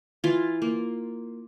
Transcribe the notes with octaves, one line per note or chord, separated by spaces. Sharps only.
E3 F4
A#3